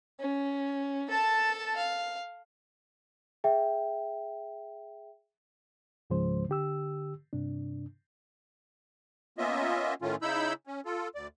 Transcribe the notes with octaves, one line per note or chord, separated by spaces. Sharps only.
C#4
A4 A5
F5
G#4 E5 G5
C#2 G#2 C#3 F3 G#3 C5
D3 G4 E6
G2 C3 D4
A#3 B3 C#4 F4 D#5 E5
A2 D#3 A3 C#4 F4
C#3 D#4 E4 B5 E6 G6
C#4
F4 A4
D2 D5